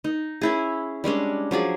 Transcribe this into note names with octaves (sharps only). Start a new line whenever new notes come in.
D#4
C#4 E4 G#4
G3 G#3 C#4 D4
F3 F#3 G#4 D5